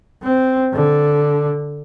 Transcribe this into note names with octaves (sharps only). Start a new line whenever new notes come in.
C4
D3